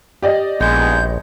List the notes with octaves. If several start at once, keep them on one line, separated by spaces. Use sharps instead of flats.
G4 D5 D#5
A#1 G#3 B3 D#4 G6